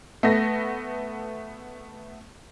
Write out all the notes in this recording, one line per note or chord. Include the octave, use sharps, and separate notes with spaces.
A3 B3 A#6